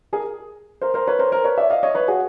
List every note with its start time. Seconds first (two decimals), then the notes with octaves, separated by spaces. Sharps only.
0.13 G#4 A#4
0.81 A#4 C5
0.94 A#4 C5
1.07 B4 C#5
1.19 A#4 C5
1.32 A#4 C5
1.44 B4 C#5
1.58 D5 E5
1.70 D#5 F5
1.83 C#5 D#5
1.95 B4 C#5
2.08 F#4 G#4